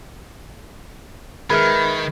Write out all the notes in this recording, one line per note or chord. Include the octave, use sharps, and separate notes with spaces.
D#3 G#3 A#4 B4 E5 B5 F6 G#6